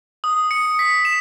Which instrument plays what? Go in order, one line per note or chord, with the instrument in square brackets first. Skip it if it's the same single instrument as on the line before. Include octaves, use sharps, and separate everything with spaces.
[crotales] D#6
C#7
B6
E7